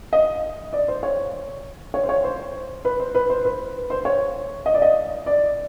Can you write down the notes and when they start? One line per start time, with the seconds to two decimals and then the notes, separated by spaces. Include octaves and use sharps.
0.13 D#5
0.73 D5
0.88 C5
1.03 C#5
1.94 C#5
2.04 C5
2.09 C#5
2.24 C5
2.85 B4
3.00 C5
3.15 B4
3.29 C5
3.45 B4
3.90 C5
4.05 C#5
4.66 D#5
4.74 D5
4.82 D#5
5.26 D5